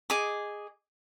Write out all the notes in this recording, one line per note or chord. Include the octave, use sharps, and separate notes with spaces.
G#4 D#5 D6